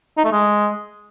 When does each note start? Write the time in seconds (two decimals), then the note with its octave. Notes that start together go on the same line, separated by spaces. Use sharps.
0.17 D#4
0.25 A3
0.32 G#3